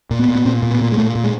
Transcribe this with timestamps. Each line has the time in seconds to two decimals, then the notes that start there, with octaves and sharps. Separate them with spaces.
0.11 A#2
0.19 B3
0.28 A#2
0.35 B3
0.45 A#2 C4
0.62 A#2
0.71 B3
0.81 A#2 A#3
0.92 G#3
0.97 A#2 A3
1.15 A#2
1.24 G#3